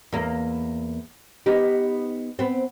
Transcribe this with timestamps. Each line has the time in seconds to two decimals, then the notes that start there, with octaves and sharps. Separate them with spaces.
0.12 E2 A#3
1.46 B3 D#4 G4
2.39 B3 C4